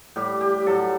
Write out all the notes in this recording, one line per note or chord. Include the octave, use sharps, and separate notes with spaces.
A2 G3 G4
G4
A2 F#3 A4